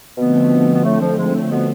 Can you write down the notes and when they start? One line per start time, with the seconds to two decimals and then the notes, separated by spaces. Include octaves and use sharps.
0.17 B2 D3 F3 A3 B3 C4
0.74 B3
0.83 A2 A3
1.00 F2 F3
1.16 G#2 G#3
1.33 A2 A3
1.50 B2 B3